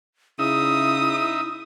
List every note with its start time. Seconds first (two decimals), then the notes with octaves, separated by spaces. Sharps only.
0.39 C#3 D#4 E4 E5 D#6